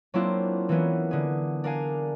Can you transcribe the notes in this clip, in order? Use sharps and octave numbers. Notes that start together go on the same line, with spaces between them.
F#3 A#3 C4 D4 E4 F4
E3 A#3 B3 C#4
D3 G#4
D4 A#4 F5 G#5